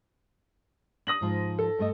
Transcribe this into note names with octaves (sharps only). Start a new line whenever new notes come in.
D4 D#6 A#6 F#7
G#2 F3 F4
A4
G2 A3 D#5